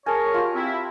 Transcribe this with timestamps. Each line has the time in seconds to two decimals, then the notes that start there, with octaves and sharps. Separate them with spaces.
0.06 G#4 A#4 C#5 G#5 A5
0.34 F4 G4
0.55 C4 E4